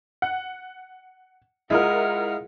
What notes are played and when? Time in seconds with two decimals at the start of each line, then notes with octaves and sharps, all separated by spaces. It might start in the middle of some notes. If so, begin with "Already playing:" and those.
0.22 F#5
1.70 G#3 E4 F4 A#4 F#5 F6